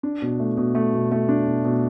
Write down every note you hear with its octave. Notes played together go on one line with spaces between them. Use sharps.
D4
B2
A3
B2
A3
B2
A3
D4
B2
B2